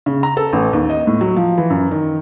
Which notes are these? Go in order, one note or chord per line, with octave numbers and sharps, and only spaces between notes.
C#3
A#5
A4
A1
D#2
D#5
A2
F#3
F3
E3
F#2
D#3